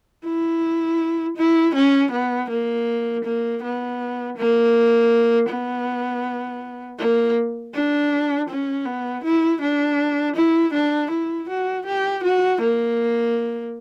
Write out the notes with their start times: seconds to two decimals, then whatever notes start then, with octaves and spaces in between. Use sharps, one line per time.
0.25 E4
1.37 E4
1.75 C#4
2.11 B3
2.49 A#3
3.24 A#3
3.62 B3
4.37 A#3
5.49 B3
6.98 A#3
7.74 D4
8.49 C#4
8.86 B3
9.24 E4
9.61 D4
10.36 E4
10.73 D4
11.10 E4
11.49 F#4
11.86 G4
12.23 F#4
12.61 A#3